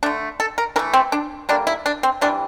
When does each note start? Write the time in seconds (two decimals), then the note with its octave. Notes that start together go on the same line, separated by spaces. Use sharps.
0.03 D3 A3 D4
0.40 A4
0.58 A#4
0.76 E3 A#4
0.79 A3
0.93 C4
1.12 D4
1.49 D3 G3 A#3 D4
1.67 E4
1.86 D4
2.03 C4
2.21 C3 E3 G3 D4